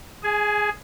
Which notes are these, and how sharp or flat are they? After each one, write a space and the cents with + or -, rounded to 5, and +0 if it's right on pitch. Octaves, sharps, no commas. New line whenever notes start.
G#4 +0 G#5 +30